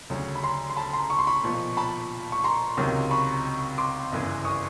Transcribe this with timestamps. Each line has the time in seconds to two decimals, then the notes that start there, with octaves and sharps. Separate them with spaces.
0.10 D2 C#3 F#3
0.35 B5
0.43 A#5 C6
0.70 C6
0.76 A5 B5
0.93 A#5 C6
1.10 C#6
1.19 C6
1.27 B5 C#6
1.43 B1 A#2 F3
1.77 A5 B5
2.32 C#6
2.44 A#5 C6
2.77 C#2 C3 D#3 F#3
3.11 B5 C#6
3.78 C6 D6
4.12 G1 F#2 C#3 E3
4.45 C#6 D#6